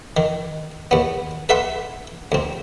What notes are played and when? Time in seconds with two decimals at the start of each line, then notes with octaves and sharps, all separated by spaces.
0.17 D#3
0.91 D#2 B3
1.49 A4 B4 E5 F#5 C6
2.32 D2 C4